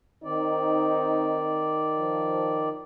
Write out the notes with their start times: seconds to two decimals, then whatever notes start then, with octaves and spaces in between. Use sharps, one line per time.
0.24 D#3 C4 D#4 D5
1.98 F3